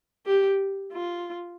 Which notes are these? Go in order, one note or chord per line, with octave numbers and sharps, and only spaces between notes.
G4
F4